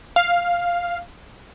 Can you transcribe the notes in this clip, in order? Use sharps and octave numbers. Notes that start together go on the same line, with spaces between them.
F5